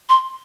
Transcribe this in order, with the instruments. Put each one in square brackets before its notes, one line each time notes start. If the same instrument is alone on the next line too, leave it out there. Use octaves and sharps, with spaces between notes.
[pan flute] C6